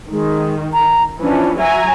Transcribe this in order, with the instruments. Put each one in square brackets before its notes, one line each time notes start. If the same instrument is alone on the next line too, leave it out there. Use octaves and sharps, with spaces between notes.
[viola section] D#3 [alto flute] G#3
[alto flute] A#5
[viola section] E3 F3 C#4 [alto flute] D4
[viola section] F#3 G#5 A#5 [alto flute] E5